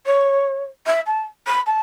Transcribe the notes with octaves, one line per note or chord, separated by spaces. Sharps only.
C#5
E5
A5
B5
A5